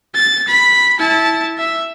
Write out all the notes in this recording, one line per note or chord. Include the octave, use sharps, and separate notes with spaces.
A6
B5
E4 A5
E5